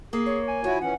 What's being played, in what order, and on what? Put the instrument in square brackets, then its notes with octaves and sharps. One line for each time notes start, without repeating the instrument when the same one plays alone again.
[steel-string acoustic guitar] A#3 [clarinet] G#4
[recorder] C#5
[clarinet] G#5
[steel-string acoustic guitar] F3 [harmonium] E4 F#4 [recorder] C#5
[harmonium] E3 C#4 [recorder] F#5